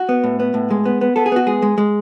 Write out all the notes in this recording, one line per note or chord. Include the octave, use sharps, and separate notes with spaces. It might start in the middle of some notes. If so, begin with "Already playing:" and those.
Already playing: F#4
B3
A2
B3
A2
G#3
B3
B3
B3 A4
G#4
B3 F#4
G#3 G#4
G#3
G#3